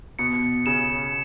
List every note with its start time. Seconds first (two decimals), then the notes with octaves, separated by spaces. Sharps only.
0.19 B2 C#7
0.66 C#3 E7